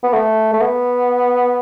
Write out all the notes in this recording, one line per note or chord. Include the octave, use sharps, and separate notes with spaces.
B3
A3
A3
B3